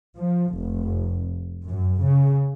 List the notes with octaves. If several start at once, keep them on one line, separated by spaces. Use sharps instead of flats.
F3
F1
F#2
C#3